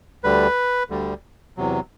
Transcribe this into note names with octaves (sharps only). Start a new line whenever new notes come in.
D2 D3 G3 B4
D2 D3 G3
E2 C3 F#3